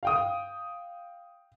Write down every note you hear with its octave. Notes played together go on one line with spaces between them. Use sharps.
F5 G5 D#6